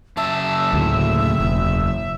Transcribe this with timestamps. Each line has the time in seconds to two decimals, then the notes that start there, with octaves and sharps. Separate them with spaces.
0.17 F#2 C#3 E5 A5
0.73 D2 A2
1.40 E1